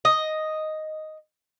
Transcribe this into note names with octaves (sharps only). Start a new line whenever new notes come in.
D#5